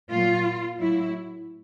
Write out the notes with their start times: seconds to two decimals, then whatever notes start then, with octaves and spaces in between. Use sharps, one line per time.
0.11 A#2 F#3 F4
0.79 A2 F#3 E4